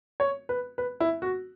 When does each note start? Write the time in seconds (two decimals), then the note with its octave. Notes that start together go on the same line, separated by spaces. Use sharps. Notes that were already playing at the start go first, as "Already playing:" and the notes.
0.20 C#5
0.49 B4
0.78 B4
1.00 E4
1.22 F#4